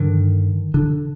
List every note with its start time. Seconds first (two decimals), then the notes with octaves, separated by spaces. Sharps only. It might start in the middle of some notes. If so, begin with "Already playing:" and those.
Already playing: G2 D3 D#3
0.74 D3